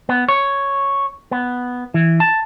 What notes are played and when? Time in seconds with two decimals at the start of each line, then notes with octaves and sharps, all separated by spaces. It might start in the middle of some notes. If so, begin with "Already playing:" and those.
0.09 B3
0.29 C#5
1.31 B3
1.94 E3
2.20 A5